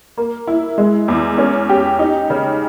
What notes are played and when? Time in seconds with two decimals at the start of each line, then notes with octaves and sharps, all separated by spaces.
0.17 A#3
0.47 E4
0.78 G#3
1.08 E2
1.38 C#4
1.69 G4
1.99 D#4
2.30 C#3